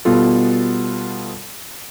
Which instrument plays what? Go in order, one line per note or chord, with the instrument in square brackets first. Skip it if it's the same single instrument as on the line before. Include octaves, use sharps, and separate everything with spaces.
[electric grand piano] B2 G3 B3 F4 A4